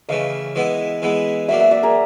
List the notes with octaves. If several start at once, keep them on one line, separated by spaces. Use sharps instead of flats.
C#3 E3 A3 D#5 F5
E3 G#3 B3 E4
E3 G#3 B3 E4
F#3 A#3 D4 E5 F#5
E5 F#5
D5 E5
G#4 A#4